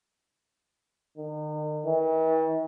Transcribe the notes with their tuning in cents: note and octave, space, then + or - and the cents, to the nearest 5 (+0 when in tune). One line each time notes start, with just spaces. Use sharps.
D#3 -40
E3 -45